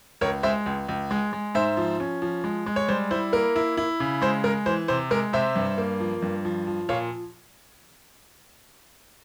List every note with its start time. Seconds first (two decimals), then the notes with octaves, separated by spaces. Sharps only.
0.21 C#2 A#4 C#5
0.43 G#3 C5 E5
0.66 C#2
0.88 C#2
1.11 G#3
1.33 G#3
1.55 G#2 C5 E5
1.77 F3
2.00 C#4
2.22 F3
2.44 G#3
2.66 G#3
2.76 C#5
2.88 G3 C5
3.11 E4 C5
3.33 A#3 A#4
3.56 E4
3.77 E4
4.00 C#3
4.22 G#3 C5
4.44 G#3 A#4
4.66 E3 C5
4.88 C3 C5
5.11 G#3 A#4
5.33 C3 C5 E5
5.56 G2
5.78 A#3
6.00 F3
6.22 G2
6.45 F3
6.67 F3
6.89 A#2 C#5 F5